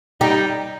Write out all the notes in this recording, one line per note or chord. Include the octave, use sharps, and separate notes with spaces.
G3 D#4 G4